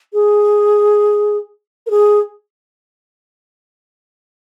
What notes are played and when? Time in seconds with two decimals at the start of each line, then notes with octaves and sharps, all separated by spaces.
0.13 G#4
1.86 A#4
1.90 G#4